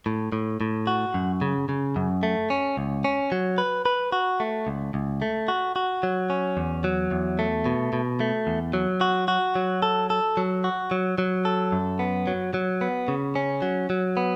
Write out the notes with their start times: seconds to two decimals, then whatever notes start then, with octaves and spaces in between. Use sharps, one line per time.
0.06 A2
0.32 A2
0.61 A2
0.87 F#4
1.14 F#2
1.41 C#3
1.69 C#3
1.96 F#2
2.23 A3
2.50 C#4
2.77 C#2
3.04 C#4
3.32 F#3
3.58 B4
3.86 B4
4.12 F#4
4.40 A3
4.67 C#2
4.94 C#2
5.22 A3
5.48 F#4
5.76 F#4
6.03 F#3
6.30 C#4
6.57 E2
6.84 F#3
7.11 E2
7.39 A3
7.66 B2
7.93 B2
8.20 A3
8.47 E2
8.73 F#3
9.01 F#4
9.28 F#4
9.56 F#3
9.82 A4
10.10 A4
10.37 F#3
10.64 F#4
10.91 F#3
11.18 F#3
11.45 A4
11.72 F#2
11.99 B3
12.27 F#3
12.54 F#3
12.81 B3
13.08 C#3
13.35 C#4
13.62 F#3
13.90 F#3
14.17 B3